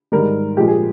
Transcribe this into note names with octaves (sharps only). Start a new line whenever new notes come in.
G#2 D#3 G3 A#4
A#2 F3 G#3 G4
G#4